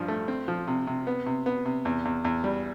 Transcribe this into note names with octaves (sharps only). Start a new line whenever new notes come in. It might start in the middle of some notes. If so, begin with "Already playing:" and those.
Already playing: G2 F3
A3
C4
F3
C3
C3
B3
C3
B3
C3
E2
E2
E2
G3